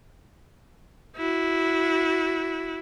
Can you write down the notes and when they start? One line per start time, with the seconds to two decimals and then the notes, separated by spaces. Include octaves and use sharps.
1.17 E4 F#4